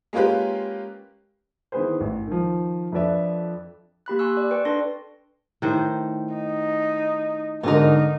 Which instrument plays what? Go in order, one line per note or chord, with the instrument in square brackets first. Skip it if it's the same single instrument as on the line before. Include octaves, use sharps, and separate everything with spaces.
[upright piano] G#3 A#3 C#4 F4 G4 B4
[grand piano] D#3 E3 B3 G#4 B4 C5
A1
D#3 F3
F2 F3 D4 B4 D5 E5
[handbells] A#3 G4 B5 F#6
G#5 C6 C#6 E6 F#6
D5
B4 G5 C#6
D4 A4 D5 C6 A#6
[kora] A2 D#3 C5
[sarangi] D#4
[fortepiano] G#2 D3 [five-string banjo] B3 A#4 [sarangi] D#4